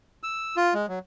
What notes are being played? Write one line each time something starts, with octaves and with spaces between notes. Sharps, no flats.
E6
F4
G#3
F#3